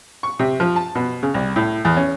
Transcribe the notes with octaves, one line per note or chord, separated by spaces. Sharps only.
C#6
C3
F3
A5
B2
C#3
C2
A2
E2
C#4